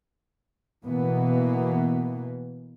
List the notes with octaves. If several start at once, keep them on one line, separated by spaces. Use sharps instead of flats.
B2 E3 A#3 B3